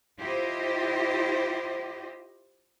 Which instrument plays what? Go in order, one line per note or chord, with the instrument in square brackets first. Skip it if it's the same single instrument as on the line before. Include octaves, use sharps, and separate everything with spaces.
[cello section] E4 F4 G4 C5 D#5